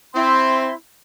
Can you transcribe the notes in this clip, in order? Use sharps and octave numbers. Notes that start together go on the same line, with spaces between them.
C4 E4 C6